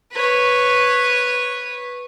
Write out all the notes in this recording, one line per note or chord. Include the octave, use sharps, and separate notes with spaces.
B4 C#5